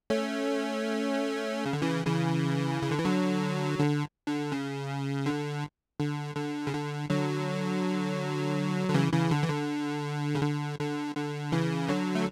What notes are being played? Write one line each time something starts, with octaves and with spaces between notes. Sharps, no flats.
A3 C#4
C#3
D3
C#3 E3
C#3 E3
C#3
D3
E3
D3 F#3
D3
D3
C#3
D3
D3
D3
C#3
D3
D3 F#3
D3
C#3 E3
C#3 E3
D3
E3
D3
C#3
D3
D3
D3
C#3 E3
D3 F#3
A3